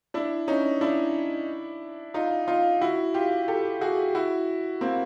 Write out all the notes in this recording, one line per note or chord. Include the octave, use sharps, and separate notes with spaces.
D4 E4
C#4 D#4
D4 E4
D#4 F4
D#4 F4
E4 F#4
F4 G4
G4 A4
F#4 G#4
E4 F#4
A#3 C4